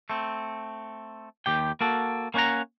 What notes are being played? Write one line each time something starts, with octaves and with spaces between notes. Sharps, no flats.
A3 C4
D#2 G4 G5
A#3 F#4 A4
A#3 C#4 C5 F#5 A#5